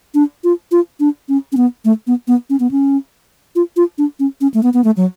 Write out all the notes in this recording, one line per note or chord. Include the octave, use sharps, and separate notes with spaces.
D4
F4
F4
D4
C#4
C#4
B3
A3
B3
B3
C#4
B3
C#4
F4
F4
D4
C#4
C#4
A3
B3
B3
A3
F#3